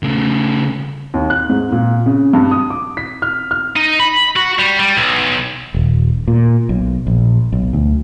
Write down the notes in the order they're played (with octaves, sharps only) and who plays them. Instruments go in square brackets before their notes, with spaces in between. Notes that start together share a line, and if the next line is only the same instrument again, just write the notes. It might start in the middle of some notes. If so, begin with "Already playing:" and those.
[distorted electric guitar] C#3 A3
[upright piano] D#2
F#6
G#2
A#2
C#3
G2
D#6
D6
B6
F6
F6
[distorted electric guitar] D#4
B5
F#4
G3
G3
B1
[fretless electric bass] D#1
A#2
B1
A#1
B1
D2